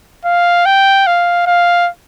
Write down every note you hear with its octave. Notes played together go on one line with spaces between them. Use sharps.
F5
G5
F5
F5